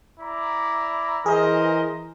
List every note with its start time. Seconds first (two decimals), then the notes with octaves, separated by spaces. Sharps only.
0.20 E4 D5 A#5
1.26 E3 G#4 A#4 C5 D#5